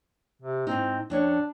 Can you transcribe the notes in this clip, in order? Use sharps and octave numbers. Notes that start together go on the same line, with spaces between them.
C3
G#2 C4 D#4
F2 C#4 D4 C#5